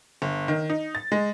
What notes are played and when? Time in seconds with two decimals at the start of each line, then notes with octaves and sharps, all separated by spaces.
0.22 G1
0.48 D#3
0.70 D#4
0.95 A6
1.12 G#3